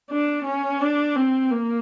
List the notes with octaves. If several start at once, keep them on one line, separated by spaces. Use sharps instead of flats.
D4
C#4
D4
C4
A#3